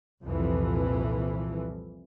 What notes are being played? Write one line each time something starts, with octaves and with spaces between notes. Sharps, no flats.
C2 F2 A#2 E3